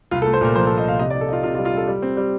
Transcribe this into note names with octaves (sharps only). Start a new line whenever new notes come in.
C2 F4
A4
A3
C5
A#2 A#4
F3 C5
A4
A#2
D#5
C2 F5
C3 D#5
D5
D#4
A4
D#4 F4
C3 F4
F4
G3
F4
G3 A4
G3
C4
G3